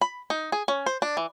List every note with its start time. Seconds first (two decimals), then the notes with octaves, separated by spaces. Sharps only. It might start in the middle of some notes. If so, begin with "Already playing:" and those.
0.01 B5
0.30 D#4
0.52 G#4
0.68 C#4
0.86 C5
1.02 D4
1.17 E3